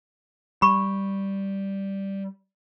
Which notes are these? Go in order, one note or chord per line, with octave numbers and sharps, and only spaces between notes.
G3 B5 C#6